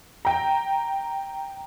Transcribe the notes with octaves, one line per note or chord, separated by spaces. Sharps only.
G5 A#5